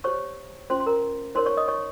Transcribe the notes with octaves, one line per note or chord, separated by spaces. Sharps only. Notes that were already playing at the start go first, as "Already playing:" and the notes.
G4 C5 C#5 C#6
C#4 F4 C5 C6
C6
A#4 A#5
D#4 A#4 C5 C#5 C6
C#5 C#6
D#5 D#6
C#5 C#6